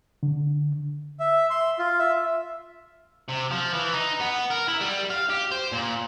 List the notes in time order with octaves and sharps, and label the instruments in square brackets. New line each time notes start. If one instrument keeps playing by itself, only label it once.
[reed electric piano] D3
[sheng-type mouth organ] E5
C6
F4
E5
[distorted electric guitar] C3
F3
E3
D#4
B3
A#4
E4
G3
F5
G4
C5
A#2